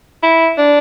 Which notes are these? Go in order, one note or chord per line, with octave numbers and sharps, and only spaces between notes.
E4
D4